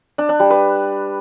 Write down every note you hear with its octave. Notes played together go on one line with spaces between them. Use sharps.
D4
D4
G3
B4